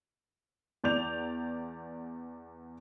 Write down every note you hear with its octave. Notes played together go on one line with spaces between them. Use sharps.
E2 D5 G6 F7